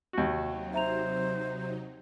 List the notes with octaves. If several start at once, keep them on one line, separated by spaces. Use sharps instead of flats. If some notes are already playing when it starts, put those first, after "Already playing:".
D#2 C3 F#3 D#4 F#4
C5 E5 A#5 F7